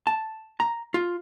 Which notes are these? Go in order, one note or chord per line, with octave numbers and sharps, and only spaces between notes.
A5
A#5
F4